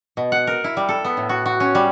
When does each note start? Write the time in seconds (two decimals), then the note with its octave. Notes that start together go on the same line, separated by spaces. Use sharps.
0.17 B2
0.32 F#5
0.47 A#4
0.64 E4
0.77 G3
0.89 A4
1.04 B3
1.17 A2
1.29 F#4
1.46 F#4
1.60 C#4
1.75 G3